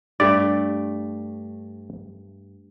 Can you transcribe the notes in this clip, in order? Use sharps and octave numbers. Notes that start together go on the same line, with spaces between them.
G2 A3 D5